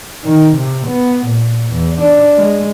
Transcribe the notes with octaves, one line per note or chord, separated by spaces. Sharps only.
D#3
C3
B3
A#2
E2
D4
G#3